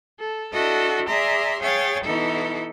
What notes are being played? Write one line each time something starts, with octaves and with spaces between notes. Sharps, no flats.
A4
D4 E4 F#4 A4 D#5
G#4 D5 E5 A#5 C6
G#4 C#5 F5 G5 A6
B2 E3 D#4 E4 A4